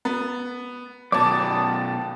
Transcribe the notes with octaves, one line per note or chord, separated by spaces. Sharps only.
B3
F#2 B2 C#5 D5 A5 D6
G5 D#6